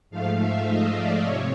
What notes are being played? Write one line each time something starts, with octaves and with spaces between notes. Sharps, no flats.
G#2 F3 A3 F5
E5
D#5
D5
C3 C#5